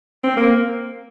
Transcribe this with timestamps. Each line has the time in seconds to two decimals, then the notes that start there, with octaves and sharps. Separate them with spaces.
0.24 C4
0.37 A#3